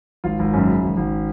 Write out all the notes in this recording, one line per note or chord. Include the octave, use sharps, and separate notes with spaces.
G#1 F4
G#1
F#2 C#4
C#3
G#1
G#1